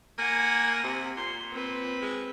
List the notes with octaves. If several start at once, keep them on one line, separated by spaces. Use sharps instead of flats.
A#3 F#5 G#5
C3
A#2 C6
C4 B4
G#3